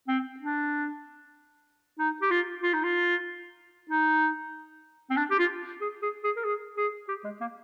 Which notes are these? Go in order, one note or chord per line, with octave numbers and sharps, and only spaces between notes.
C4
D4
D#4
G4
F4
F4
D#4
F4
D#4
C4
D4
G4
F4
G#4
G#4
G#4
A#4
G#4
G#4
G4
G#3
A#3